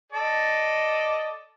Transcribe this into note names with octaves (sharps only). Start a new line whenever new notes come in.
A4 D5 D#5